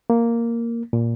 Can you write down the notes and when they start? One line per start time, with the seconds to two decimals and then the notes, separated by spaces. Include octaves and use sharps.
0.10 A#3
0.93 A#2